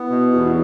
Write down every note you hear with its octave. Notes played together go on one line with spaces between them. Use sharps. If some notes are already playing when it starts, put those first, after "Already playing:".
Already playing: B3 E4
B2
E2 F#4
E4